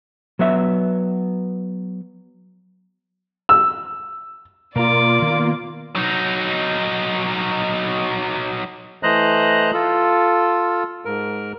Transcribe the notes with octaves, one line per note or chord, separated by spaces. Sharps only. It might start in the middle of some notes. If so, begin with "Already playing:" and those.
F#3 B3 E5
E6
B2 A#3 F4 A#4 D5 A#5 D6
D#3 B3
F#3 D#4
E3 A3 C5 D#5 A#5 F#6
F4 A4
G#2 A#4